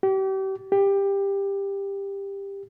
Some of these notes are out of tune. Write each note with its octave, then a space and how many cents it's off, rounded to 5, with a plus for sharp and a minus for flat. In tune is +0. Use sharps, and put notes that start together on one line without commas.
G4 -35
G4 +15